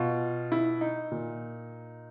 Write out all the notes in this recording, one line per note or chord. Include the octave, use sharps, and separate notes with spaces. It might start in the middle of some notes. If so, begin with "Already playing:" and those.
Already playing: B2 F4
E4
D#4
A#2